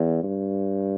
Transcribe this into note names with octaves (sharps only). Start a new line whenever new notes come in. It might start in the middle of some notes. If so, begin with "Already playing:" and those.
Already playing: E2
G2